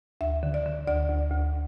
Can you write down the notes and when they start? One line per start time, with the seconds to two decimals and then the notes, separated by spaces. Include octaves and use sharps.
0.21 D2 E5
0.43 D3
0.54 D5
0.66 D3
0.87 D2 D5
1.09 D2
1.31 D2